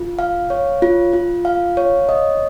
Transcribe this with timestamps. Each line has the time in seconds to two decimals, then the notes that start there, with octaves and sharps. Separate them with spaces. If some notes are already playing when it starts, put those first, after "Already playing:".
Already playing: F4
0.19 F5
0.50 C#5
0.82 F4
1.13 F4
1.45 F5
1.77 C#5
2.09 D#5